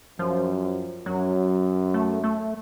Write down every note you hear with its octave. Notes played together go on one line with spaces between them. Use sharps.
F#2 F3
F#2 F#3
A3
A3